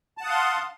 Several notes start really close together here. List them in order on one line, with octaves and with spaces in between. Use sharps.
A5 F#5 D#6 F5 C6